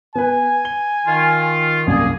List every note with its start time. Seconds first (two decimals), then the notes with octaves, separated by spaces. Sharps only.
0.15 B3 B4 G#5
0.65 G7
1.06 D#3 F4
1.87 C2 F#2 A#3 G#4